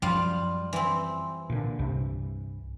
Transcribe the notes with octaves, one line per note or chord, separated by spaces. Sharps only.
F#2 F3 G3 F4 F5
E3 C4
A#2 D3
C2 G2 C3